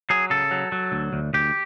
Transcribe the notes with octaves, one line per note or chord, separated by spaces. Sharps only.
F#3 G#4
C#3 A4
F#3
F#3
D2
D2
D2 G4